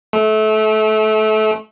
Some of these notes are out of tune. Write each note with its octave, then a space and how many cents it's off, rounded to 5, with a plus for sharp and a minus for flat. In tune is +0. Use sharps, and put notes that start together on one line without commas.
A3 -25